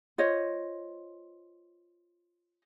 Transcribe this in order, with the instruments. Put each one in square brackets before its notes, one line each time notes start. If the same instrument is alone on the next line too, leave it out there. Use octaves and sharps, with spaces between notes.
[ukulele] F4 C5 C#5 D#5